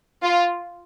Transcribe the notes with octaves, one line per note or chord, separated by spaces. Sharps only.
F4